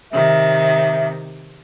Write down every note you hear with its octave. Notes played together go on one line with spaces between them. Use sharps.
C3 D#3 E5